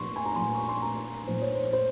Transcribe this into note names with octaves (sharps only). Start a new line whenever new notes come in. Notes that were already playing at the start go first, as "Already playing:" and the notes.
Already playing: A#2 F3 C6 C#6
G#5
A#5
A#2 F3 C6
C#6
C6
A#5
A#2 F3 C5
C#5
C5
C5